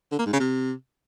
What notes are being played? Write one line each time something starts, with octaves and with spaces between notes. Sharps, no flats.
D3
A#3
G#2
C#3
C3